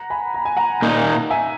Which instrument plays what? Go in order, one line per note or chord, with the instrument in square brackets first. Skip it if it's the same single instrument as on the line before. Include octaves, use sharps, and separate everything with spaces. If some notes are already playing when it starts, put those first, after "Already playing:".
Already playing: [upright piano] F#5 A#5
G#5 B5
A#5
G#5
F#5 A#5
[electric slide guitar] A#2 A#3 D#4
[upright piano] E5 G#5